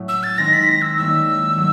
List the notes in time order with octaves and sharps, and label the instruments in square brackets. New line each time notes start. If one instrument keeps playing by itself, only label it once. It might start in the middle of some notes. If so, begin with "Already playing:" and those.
Already playing: [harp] A2 F#3 A3 C#4
[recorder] E6
A6
[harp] D#3 G#3 C4 D#4 [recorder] A#6
[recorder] B6
A#6
E6
[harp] D#3 G3 A#3 C#4 E4 [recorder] E6
[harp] D#3 F#3 A3